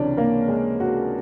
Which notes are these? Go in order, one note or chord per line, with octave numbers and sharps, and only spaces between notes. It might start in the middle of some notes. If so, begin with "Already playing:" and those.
Already playing: C#2 C3 E3 C#4 D4 D5
A#3 A#4
G#3 G#4
F#4